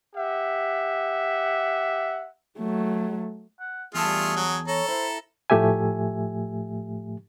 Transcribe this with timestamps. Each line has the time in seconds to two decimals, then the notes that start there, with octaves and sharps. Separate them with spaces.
0.16 G4 E5 F#5
2.58 F#3 A3
3.60 F#5
3.94 E2 G3 A3 F4 G#4 A5
4.36 F#3
4.68 A4 C#5 A#5
4.88 E4 C5
5.50 A2 F3 A3 G4 E5 G#5